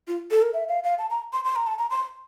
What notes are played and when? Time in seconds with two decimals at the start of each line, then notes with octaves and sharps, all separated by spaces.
0.08 F4
0.31 A4
0.42 A#4
0.54 E5
0.69 F5
0.84 F5
0.99 A5
1.10 A#5
1.33 C6
1.45 C6
1.56 A#5
1.67 A5
1.79 A#5
1.90 C6